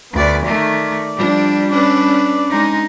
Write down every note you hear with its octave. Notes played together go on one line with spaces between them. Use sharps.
D2 B3 D5
D#3 A3 D5
F3 G3 D4
C#4 D4 B4 D5
G#3 D#4